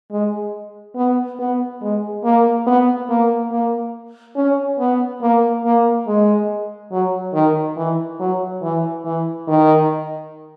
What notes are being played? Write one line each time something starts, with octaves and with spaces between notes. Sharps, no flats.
G#3
B3
B3
G#3
A#3
B3
A#3
A#3
C#4
B3
A#3
A#3
G#3
F#3
D#3
E3
F#3
E3
E3
D#3